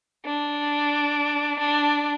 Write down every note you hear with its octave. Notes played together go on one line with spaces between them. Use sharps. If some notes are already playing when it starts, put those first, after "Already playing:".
D4
D4